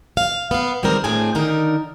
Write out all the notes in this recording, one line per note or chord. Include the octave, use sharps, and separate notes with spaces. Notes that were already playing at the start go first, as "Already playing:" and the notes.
F5
B3 F5
D#3 G3 G#3 C4 A#4
A2 C4 D4 G#4 G#5
D3 D#3 D#4 A#4